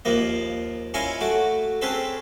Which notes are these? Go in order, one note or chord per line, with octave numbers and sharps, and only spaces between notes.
D#2 F3 A#3 D#5
C#4 E4 F4 D#5 G#5 C#6
A3 F#4 D6
C4 C#4 G#4 A4 B4 C5